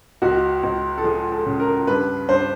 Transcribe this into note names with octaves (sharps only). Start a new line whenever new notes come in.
C#2 F#4
C#2
A4
F3 G#4
A4
C#3
A#4
G2 B4
G2 C5